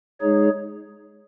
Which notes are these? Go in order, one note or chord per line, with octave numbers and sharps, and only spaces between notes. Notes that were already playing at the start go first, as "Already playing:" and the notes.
G#3 D#4 G#4 C#5